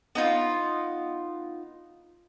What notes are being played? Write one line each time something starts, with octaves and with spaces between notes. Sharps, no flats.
B3 D#4 F4